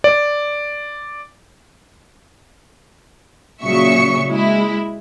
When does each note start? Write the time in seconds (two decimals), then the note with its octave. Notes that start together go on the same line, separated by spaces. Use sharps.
0.04 D5
3.63 A#2 C#3 F#3 E5 C#6 C#7
4.29 G#3 E4